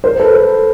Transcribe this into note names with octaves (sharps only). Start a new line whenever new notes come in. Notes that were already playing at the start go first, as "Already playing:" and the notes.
A#4 C5
A4 B4
A4 B4